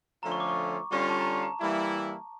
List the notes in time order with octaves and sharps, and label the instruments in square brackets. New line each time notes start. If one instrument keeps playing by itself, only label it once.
[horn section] D3 F3 A3 C#4 F4 [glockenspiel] A#5
[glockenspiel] C#6
D6
C#6
[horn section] D3 G3 C#4 F4 [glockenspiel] C#6
[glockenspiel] A5
A#5
A5
A#5
[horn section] E3 G3 A#3 E4